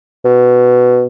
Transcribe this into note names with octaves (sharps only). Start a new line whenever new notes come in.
B2